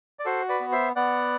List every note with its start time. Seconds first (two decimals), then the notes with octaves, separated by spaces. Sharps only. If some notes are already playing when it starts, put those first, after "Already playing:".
0.19 D5
0.25 F#4 A4 C5
0.49 B4 D5
0.60 B3
0.72 C5 E5
0.96 B3 D5 F#5